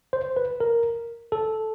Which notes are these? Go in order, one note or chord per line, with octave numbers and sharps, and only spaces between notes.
C5
B4
A#4
A4